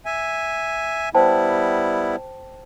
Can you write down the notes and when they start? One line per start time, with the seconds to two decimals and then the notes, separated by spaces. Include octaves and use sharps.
0.06 E5 G#5
1.15 G3 B3 E4 C5 G5 A5